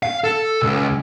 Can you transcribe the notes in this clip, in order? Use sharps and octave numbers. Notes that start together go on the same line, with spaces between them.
F5
A4
C#2